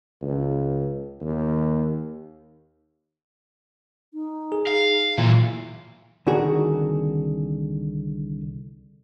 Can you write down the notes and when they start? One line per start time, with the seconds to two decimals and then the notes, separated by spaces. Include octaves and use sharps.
0.22 C#2
1.21 D#2
4.14 D#4
4.52 G#4
4.67 F5
5.18 B1 A#2 E3
6.27 C2 D3 D#3 F#4 G#4